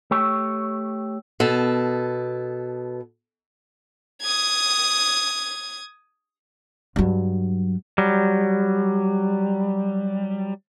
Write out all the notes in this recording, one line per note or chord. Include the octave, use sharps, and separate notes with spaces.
A3 G4 C#5
B2 A4
D#6 G#6
G2 F#3
F#3 G3